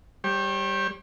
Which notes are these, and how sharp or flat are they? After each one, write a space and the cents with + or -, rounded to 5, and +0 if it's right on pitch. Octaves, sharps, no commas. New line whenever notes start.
G3 +0 G4 +0 C#5 -40